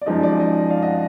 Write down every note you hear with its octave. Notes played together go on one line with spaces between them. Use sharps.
D5
F#2 F3 G#3 D#4 D#5
D5
D#5
D5 F5
D#5 F#5